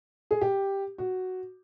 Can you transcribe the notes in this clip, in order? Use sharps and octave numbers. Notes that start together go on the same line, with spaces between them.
G#4
G4
F#4